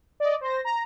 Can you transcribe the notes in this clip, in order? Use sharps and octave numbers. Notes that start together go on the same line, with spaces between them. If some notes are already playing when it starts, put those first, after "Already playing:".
D5 D#5
C5 A#6
A#5